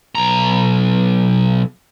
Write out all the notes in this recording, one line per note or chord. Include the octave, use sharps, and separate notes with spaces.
B1 A#5